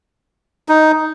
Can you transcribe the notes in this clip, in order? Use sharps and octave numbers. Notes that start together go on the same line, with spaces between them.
D#4